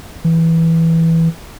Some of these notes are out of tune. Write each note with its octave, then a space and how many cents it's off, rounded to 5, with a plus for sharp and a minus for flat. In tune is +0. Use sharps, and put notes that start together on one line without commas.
E3 -5